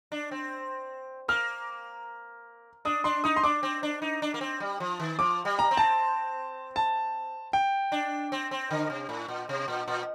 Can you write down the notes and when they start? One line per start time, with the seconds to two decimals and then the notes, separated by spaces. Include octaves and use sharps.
0.12 D4
0.31 C4
1.28 A#3 F6
2.85 D4 D#6
3.04 D4 C6
3.24 D#4 D#6
3.37 C6
3.44 D4 D6
3.63 C4
3.83 D4
4.02 D#4
4.22 D4
4.34 A#3
4.41 C4
4.60 G3
4.80 F3
5.00 D#3
5.19 F3 D6
5.45 G3
5.59 A#5
5.71 C4
5.77 A5
6.76 A5
7.53 G5
7.92 D4
8.32 C4
8.51 C4
8.71 D3
8.90 C3
9.09 A2
9.28 A#2
9.49 C3
9.68 A#2
9.88 A#2